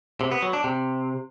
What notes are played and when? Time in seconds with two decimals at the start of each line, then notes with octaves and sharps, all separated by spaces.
0.21 C3
0.32 B3
0.42 F#3
0.53 D4
0.64 C3